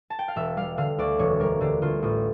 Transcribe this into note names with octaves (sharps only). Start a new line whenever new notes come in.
A5
G5
F5
E1 E5
G3 F5
D3 F5
D2 D5
E1 C#5
G3 A#4
D3 G4
D2 F4
A1 F4